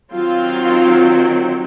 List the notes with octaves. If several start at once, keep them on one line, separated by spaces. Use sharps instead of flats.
D#3 F#3 C4 F4